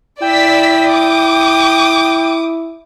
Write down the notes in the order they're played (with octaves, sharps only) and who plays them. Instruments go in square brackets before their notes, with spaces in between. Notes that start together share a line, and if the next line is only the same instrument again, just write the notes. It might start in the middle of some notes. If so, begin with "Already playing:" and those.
[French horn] E4 [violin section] D5 E6 B6 [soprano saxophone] G5
[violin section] D6 D#6